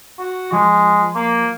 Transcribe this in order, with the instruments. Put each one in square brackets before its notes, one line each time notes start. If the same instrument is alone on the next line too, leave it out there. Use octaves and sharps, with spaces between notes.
[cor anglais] F#4
[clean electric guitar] F3 [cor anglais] G#3
[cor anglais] A#3